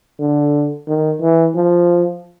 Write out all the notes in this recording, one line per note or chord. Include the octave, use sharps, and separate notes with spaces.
D3
D#3
E3
F3